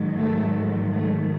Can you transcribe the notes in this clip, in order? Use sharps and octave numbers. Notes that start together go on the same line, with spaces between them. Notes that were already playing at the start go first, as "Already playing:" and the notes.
Already playing: G#2 D#3 F#3
A3
A3